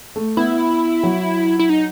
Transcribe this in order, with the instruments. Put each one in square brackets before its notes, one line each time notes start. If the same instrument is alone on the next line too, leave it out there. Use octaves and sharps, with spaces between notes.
[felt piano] A3
[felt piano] B3 [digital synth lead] E4
[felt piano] F#3
[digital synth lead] E4
D#4